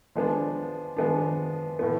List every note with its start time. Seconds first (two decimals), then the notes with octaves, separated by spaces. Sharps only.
0.16 F3 G#3 B3 D4
0.97 F3 G#3 B3 D4
1.79 A2 F3 B3